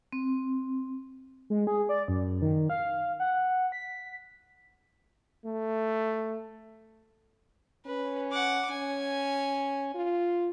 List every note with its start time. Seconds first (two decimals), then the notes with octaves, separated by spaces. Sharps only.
0.13 C4
1.50 G#3
1.67 G#4
1.89 D5
2.08 F#2
2.42 D#3
2.70 F5
3.20 F#5
3.72 B6
5.46 A3
7.86 C#4 B4
8.31 F#5 D6
8.71 C#4 G#5
9.94 F4